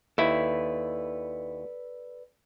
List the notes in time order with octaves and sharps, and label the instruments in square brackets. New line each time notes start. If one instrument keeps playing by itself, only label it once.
[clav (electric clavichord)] D#2 E4 [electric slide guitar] A4 B4 D5